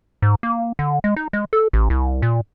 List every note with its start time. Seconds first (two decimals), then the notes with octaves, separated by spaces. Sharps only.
0.22 G#2
0.43 A#3
0.79 D3
1.04 G#3
1.16 D#4
1.33 G#3
1.53 A4
1.73 A1
1.90 C2
2.22 A#2